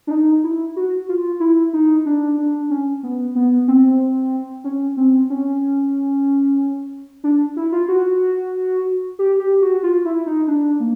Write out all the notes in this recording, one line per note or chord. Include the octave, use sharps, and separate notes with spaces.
D4
D#4
E4
F#4
F4
E4
D#4
D4
D4
C#4
B3
B3
C4
C#4
C4
C#4
D4
E4
F4
F#4
G4
G4
F#4
F4
E4
D#4
D4
A#3